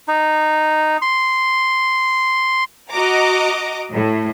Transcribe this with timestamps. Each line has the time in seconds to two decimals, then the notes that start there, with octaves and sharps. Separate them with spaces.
0.08 D#4
1.02 C6
2.91 F#4 D#5 A#5 D6
3.91 A2